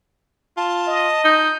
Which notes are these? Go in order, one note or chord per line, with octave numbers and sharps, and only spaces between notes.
F4 A5
D#5
D#4 G6